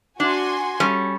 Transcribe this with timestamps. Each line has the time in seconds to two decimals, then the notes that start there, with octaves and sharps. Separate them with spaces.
0.20 D4 F#4 G#5 C6
0.80 G3 C#4 A4